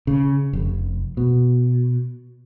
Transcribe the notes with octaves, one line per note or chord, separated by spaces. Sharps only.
C#3
F1
B2